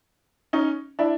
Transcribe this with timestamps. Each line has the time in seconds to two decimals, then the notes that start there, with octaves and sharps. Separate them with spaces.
0.53 C#4 D#4
0.99 D4 E4